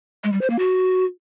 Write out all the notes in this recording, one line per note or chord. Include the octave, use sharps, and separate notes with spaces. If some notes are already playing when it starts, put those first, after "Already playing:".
G#3
G3
C5
A#3
F#4